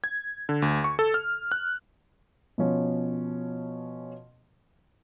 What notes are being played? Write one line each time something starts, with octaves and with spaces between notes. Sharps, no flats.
G#6
D3
D2
C#6
A4
F6
F#6
B2 F3 C#4